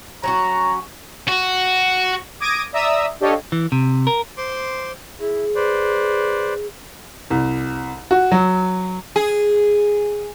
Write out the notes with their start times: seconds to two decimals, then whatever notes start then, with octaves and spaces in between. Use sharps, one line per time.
0.23 F#3 C#4 F#4 A#5
1.28 F#4
2.40 D6 D#6 G#6 A#6 D7 D#7
2.73 D5 E5 A#5 D#6 E6
3.20 D4 G4 A4 C#5 D#5 F5
3.52 E3
3.72 C3
4.07 A#4
4.37 C5 C6 D6
5.20 E4 G#4
5.55 B4 C5 D5
7.30 C2
8.11 F#4
8.32 F#3
9.16 G#4